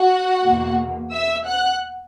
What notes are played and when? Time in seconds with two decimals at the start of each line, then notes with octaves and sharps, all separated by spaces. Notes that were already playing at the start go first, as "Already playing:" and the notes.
Already playing: F#4 F#5
0.44 E2 B2 A#3
1.12 E5 E6
1.45 F#5 F#6